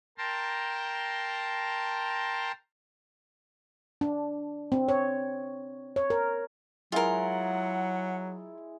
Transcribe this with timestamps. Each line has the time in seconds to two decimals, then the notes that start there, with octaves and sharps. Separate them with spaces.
0.18 A#4 G5 A5 A#5 C6
4.01 D4
4.72 C4
4.88 C#5
5.96 C#5
6.10 A#4
6.92 F#3 G#3 E4 F4 A#4 F#5 G#5